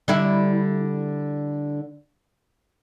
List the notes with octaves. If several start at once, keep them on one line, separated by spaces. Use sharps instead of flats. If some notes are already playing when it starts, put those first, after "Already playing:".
D3 G3 E4